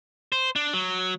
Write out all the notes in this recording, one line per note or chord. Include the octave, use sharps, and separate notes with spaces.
C5
D4
F#3